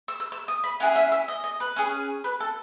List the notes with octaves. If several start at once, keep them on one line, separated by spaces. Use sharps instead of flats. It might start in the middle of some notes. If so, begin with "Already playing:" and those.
E6
E6
E6
D#6
B5
C#4 E4 G#4 F#5
E5
E5
D#5
D#5
B4
C#4 G#4
B4
A4